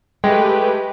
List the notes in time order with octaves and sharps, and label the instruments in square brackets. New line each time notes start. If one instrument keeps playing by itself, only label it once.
[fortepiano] G#3 [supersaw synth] A3 G4 B4 [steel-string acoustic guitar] G5